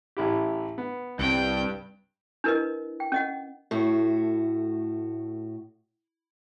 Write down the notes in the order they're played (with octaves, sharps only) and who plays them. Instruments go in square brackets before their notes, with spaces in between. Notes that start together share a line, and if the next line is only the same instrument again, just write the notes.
[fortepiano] A1 E4 G4
B3
[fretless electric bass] C2 C4 [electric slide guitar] G2 [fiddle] G5
[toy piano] D4 E4 A#4 B4 D#5
G5
C#4 D#5 F#5
[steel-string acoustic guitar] A2 A3 F#4